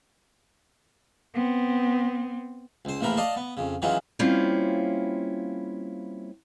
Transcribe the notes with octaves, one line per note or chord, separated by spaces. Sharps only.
B3 C4
C#2 C5
A#1 A2 E3 F3 A#4 B5
D5 D#5 F5 A5 C6
B3
F2 C#3
D#3 E3 F#3 G#3 C#4 F4
G3 A#3 C4 C#4 E4 F4